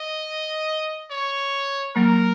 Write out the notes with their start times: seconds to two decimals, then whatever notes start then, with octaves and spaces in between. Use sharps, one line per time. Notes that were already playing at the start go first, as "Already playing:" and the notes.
Already playing: D#5
1.11 C#5
1.96 F#3 A#3 A#4